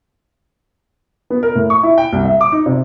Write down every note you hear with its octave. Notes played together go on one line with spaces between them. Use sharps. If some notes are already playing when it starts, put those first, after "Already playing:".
B3
A#4
A2
C#6
E4
G5
C2
E5
D6
D#4
C3